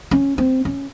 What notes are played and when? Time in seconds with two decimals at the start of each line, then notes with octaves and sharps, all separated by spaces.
0.11 C#4
0.38 C4
0.65 C#4